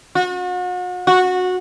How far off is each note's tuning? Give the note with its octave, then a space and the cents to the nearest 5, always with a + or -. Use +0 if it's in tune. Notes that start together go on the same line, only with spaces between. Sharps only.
F#4 -40
F#4 -15